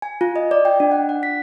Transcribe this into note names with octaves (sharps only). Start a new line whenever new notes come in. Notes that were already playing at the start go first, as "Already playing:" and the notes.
G#5
F4
D#5
D5
G5
D4
F#5
F#5
B6